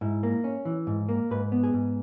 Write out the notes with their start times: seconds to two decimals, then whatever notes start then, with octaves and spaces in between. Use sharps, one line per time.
0.01 G#2 E4
0.23 A#3
0.44 C#4
0.65 E3
0.87 G#2
1.09 A#3
1.31 G#2 B4
1.52 B3
1.63 G#4
1.74 G#2